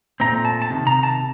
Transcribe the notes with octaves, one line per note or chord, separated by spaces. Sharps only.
A#2 A3 C4 A#5
A5
A5
C3 D#3
A#5
A5